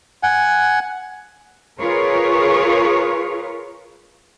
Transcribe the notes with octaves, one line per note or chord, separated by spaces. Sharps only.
F#5 G#5
F4 G#4 A#4 B4 C#5